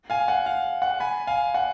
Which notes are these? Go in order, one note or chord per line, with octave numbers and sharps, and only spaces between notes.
F5 G#5
F#5
F5
F#5
G#5 B5
F5 G#5
F#5